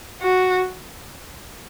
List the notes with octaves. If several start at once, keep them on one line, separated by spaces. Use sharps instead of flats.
F#4